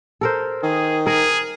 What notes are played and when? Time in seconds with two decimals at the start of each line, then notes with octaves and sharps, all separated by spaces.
0.21 A4 A#4 C5
0.63 D#3 G#4
1.07 G#4 A#4